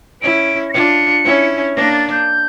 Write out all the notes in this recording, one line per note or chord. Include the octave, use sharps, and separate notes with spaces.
C#4 E4 D7
A#6
D4 F4 C#7
C#4 E4
A#3 D4 A#6
A6
G6